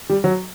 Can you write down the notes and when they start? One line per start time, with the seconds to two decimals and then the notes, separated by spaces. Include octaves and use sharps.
0.09 G3
0.24 F#3